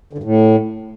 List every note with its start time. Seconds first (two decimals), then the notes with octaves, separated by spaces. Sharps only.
0.13 D3
0.18 G2
0.23 A2